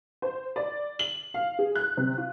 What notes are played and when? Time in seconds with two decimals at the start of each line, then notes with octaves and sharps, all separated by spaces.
0.22 C5
0.56 D5
0.99 F#7
1.34 F5
1.59 G#4
1.75 F#6
1.97 C3
2.18 F4